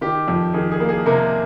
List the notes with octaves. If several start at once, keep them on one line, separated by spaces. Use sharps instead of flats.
D#3 G4
F2
D#3 G#4
G#4
A#3
G#4
C3 A#3 A#4